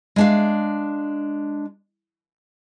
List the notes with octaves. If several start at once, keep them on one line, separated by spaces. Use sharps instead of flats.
G#3 D4 F5